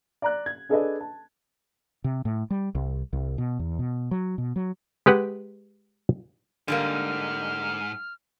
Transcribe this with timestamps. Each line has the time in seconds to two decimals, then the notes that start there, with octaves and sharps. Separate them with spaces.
0.22 D5 A#5 F#6
0.46 G#6
0.69 D4 G#4 A4 B4 D5 D#5
1.01 A5
2.04 C3
2.25 A2
2.50 G3
2.75 C2
3.13 C2
3.38 B2
3.59 E2
3.79 B2
4.11 F#3
4.38 B2
4.56 F#3
5.06 G#3 G4 B4 F#5
6.68 G#2 D3 G3 A#3 F6